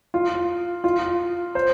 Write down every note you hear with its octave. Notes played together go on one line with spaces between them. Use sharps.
F4
F4
C5